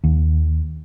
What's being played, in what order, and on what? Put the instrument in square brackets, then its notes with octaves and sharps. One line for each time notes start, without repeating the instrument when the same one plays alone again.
[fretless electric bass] D#2